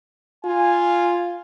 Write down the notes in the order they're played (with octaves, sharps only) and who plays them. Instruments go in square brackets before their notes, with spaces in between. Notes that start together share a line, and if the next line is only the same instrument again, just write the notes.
[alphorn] F4 [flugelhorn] G#5